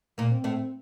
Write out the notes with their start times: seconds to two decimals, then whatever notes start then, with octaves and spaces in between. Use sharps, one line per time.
0.18 A#2 A#3
0.31 C4
0.44 A2 A3